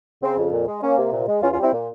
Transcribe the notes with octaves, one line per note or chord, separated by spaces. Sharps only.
C#3 C4
F2
A#2
G#3
A#3 C#4
C3
A#2
G#3
E2 C#4 F4
C#4 F4
G3 C4 E4
A#2